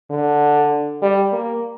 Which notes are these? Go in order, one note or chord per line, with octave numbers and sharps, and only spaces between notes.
D3
G3
A#3